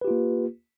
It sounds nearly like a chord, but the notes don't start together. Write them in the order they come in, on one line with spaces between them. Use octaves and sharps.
B4 G4 F4 A#3